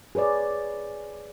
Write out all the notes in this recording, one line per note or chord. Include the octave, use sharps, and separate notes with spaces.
G#4 B4 C#5 D5